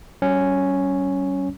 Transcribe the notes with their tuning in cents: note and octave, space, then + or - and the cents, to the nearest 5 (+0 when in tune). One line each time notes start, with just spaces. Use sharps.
G3 -45 C#4 +0